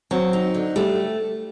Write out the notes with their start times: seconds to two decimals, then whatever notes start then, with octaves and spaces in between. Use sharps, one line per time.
0.11 F#3 C4
0.33 D#4
0.54 D3
0.76 G3 A3